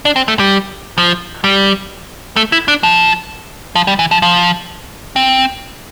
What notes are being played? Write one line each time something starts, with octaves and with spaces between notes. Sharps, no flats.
D4
C4
A3
G3
F3
G3
A3
E4
D4
F3
F3
G3
E3
F3
F3
C4